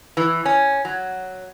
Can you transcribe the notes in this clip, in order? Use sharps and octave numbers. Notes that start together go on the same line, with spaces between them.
E3
C#4
F#3